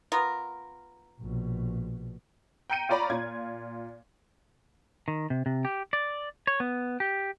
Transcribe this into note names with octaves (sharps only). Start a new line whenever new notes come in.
B3 F4 A#4
A#1 B2
G5 A#5 G6 C#7 D#7
F4 C#5 D5 A#5 B5
A#2 F4 G#6
D#3
C3
C3
G4
D5
C#5
B3
G4